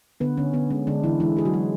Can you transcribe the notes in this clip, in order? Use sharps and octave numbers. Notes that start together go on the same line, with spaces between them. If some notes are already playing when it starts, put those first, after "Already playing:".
D3 B3 B4
D3 C#4
D3 B3
G#3 C#4
D3 G#3 D4
D3 E3 E4
E3 G#3 E4
G#3 G#4
F#3 F#4
G#3